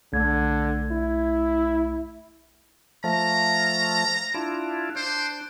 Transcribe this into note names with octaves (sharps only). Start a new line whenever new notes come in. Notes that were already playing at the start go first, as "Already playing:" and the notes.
B1 D3 A3 G#6
E4
F3 A3 A#5
D4 E4 F4
D4 C5